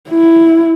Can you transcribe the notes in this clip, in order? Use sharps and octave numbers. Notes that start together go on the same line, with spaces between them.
E4